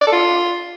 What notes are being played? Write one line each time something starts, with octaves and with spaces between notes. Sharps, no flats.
D5
A4
F4